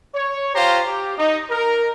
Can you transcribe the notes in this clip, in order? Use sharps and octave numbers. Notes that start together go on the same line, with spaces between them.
C#5
F4 G4 C5 F5 A#5 C6
G4
D#4
A#4